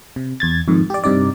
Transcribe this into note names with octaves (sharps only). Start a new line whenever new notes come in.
C3
E2 G#6 A6
F2 G#2 D#3
G4 D5
G2 C3 D#4 D5